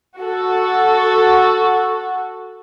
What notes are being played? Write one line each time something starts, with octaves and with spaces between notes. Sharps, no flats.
F#4 A4